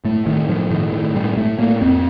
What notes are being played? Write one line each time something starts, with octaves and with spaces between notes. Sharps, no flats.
A2 A3
A2 D#3
A2 F3
A2 D#3
A2 D#3
A2 G3
A2 A3
A2 A#3
F2 C4